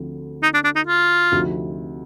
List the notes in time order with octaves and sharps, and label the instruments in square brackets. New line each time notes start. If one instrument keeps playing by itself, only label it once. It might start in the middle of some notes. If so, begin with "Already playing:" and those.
Already playing: [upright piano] D2 D3 F3 C4
[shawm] D#4
D4
D4
D#4
F4
[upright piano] D2 C3 F3 C4 D#4